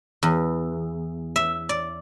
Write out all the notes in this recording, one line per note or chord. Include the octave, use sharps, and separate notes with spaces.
E2
E5
D5